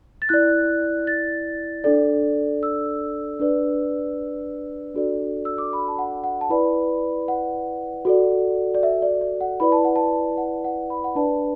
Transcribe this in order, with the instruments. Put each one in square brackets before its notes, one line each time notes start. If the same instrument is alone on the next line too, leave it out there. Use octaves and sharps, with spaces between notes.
[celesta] A6
E4 D5 F#6
A6
D4 A4 D5
E6
D4 B4 D5
D4 F#4 A4 D5
E6
D6
B5
A5
F#5
F#5
A5
E4 B4 D5 B5
F#5
F#4 A4 D5
D5
E5
D5
D5
F#5
E4 B4 D5 B5
A5
F#5
A5
F#5
F#5
B5
F#5
D4 B4 D5 A5